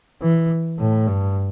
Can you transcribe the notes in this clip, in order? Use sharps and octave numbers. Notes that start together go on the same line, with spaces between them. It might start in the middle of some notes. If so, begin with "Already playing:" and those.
E3
A2
G2